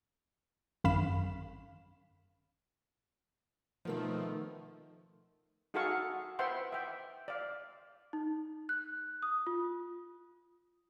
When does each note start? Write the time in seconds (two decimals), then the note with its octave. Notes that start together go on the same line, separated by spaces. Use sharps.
0.84 G#1 F#2 F5 B5 B6 E7
3.85 B2 D#3 F3 A3 C4
5.74 D#4 F#4 G#4 A4 F5 C#6
6.39 B4 C5 E5 F#5 G5 C6
6.72 E5 G5
7.28 D5 F5
8.13 D#4
8.69 F#6
9.23 D#6
9.47 F4